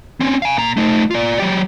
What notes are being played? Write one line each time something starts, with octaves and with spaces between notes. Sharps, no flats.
C4 C#4
F5 G#5
A#2 A#5
A3 D#4
F4 D5
F#3 G4